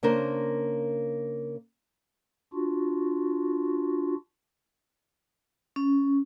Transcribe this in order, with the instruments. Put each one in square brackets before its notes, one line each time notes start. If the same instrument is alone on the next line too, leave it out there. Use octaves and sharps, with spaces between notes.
[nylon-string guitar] C#3 A#3 D4 A#4 C5
[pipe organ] D4 F4 F#4
[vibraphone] C#4